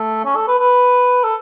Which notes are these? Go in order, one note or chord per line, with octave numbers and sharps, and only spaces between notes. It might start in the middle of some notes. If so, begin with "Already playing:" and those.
Already playing: A3
C#4
A4
B4
B4
A4